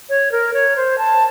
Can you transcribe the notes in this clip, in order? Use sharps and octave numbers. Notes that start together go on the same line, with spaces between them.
C#5
A#4
C#5
C5
A5